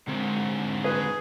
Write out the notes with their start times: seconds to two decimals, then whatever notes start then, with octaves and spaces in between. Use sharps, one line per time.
0.08 G#2 D3 D#3 C4
0.84 G#4 B4